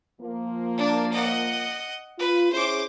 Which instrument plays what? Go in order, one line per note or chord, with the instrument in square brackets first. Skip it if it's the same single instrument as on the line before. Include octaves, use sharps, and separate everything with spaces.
[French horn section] F3 A#3
[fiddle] D4
D#5 F#5
[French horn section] F4 [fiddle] B4
[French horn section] C#4 E4 G#4 [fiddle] C5 D6